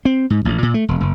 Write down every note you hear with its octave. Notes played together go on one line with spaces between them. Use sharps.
C4
G#2
A1
A#2
A3
E1
F#1